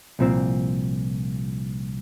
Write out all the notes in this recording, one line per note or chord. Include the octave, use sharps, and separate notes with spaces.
C2 A#2 F3 C4